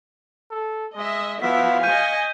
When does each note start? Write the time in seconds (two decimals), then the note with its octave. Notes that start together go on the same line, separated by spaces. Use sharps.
0.51 A4
0.96 G#3 D#5 E5
1.42 F3 B3 E4 F#4 E5 F5 B6
1.83 D#5 G#5 C#6 F6 G6 D#7